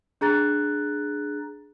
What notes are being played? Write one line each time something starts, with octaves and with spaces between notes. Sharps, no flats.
D4 G#4 A#5 F#6 A6